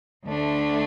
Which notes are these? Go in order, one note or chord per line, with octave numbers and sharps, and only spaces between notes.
D2 D3 A3 D4